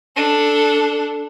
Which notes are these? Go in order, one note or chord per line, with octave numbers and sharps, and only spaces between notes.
D4 A4